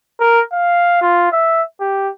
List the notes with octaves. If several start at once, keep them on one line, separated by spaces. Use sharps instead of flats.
A#4
F5
F4
E5
G4